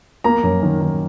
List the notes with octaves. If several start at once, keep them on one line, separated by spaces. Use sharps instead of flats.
A#3 A#5
F#2
D#3
D#3